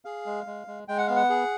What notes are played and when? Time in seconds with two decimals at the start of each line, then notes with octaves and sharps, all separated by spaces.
0.05 G#4 F5
0.26 G#3
0.46 G#3
0.67 G#3
0.88 G#3 G5
0.98 F#5
1.07 B3 F5
1.16 F#5
1.30 G#4